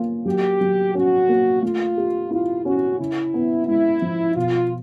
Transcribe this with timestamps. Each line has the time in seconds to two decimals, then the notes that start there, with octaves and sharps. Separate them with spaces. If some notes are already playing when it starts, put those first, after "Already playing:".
Already playing: A#3 C#4 F4
0.26 F#3 G4
0.61 F#3
0.94 C#4 F#4
1.29 A#3
1.62 A3 F4
1.97 G4
2.31 E4 F4
2.65 C#4 F#4
2.99 C#3 E4
3.34 B3
3.67 G#3 E4
4.02 F3
4.36 B2 F4